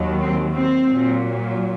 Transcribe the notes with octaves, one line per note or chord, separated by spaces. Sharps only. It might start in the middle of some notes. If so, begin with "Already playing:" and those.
Already playing: D#2 D#3 F#3
C4
C4
A#2 F#3